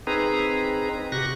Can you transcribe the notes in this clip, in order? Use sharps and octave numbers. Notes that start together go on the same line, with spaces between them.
C4 D#4 G#4 B4 A#5
C3 F#4 G4 C#6 F#6 A#6